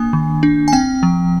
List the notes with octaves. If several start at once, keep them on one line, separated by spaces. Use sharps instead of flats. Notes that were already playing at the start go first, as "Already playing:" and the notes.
Already playing: A#3 D4 G#5
D#3
D4
G#5
C4 G5
F3